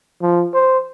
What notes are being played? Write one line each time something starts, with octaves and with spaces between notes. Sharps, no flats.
F3
C5